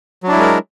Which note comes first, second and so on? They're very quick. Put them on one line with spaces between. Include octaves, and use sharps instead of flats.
F#3 D4 E4 G#3 A#4